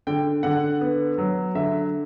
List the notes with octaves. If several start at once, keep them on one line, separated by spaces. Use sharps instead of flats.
D3 G5
D3 F#5
B3
F#3
D3 E5